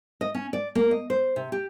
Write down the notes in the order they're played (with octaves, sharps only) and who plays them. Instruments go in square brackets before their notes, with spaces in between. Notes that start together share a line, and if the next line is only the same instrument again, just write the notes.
[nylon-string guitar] D#5
C#4
D5
A#3
D#5
C5
C3
G4